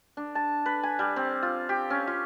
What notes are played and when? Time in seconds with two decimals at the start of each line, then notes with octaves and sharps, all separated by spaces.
0.17 D4
0.35 A5
0.66 B4
0.83 G#5
0.99 G3
1.16 C4
1.43 F4
1.69 G4
1.90 C#4
2.07 F4